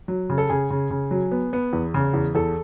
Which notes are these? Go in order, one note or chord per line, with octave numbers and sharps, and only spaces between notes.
F#3
C#3
A4
C#3 G#4
C#3
C#3
F#3
B3
B3
E2
C#3
E2
E2 A4